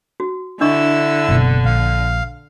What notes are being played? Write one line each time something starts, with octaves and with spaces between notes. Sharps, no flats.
F#4
D3 D4 E4 D#5 C#6 E6
F#1 B2
A#1 F5